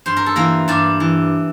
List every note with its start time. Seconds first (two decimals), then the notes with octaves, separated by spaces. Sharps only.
0.06 G2 C5
0.17 A#4
0.26 A4
0.36 E3 A#3 A#4
0.68 G2 D4 D5
1.00 E3